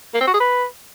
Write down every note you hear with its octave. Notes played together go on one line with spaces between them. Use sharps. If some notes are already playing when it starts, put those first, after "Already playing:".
A#3
C4
F#4
G#4
B4